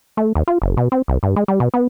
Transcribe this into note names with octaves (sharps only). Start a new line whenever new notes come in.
A3
D#2
F4
F#1
B2
C4
C2
G2
G#3
G3
B2
B3